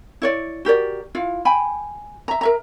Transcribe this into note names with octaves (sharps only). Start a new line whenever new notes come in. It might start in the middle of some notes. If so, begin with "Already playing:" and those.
E4 C#5 D5
F#4 G4 A#4 D5
E4 F4 F5
G5 G#5 B5
E5 A#5
A#4 E5 A#5